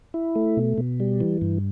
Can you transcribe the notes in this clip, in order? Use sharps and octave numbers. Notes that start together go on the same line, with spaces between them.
E4
A3
B2
B2
G3
E3
G2